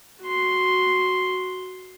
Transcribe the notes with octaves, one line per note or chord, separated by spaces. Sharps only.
F#4 C6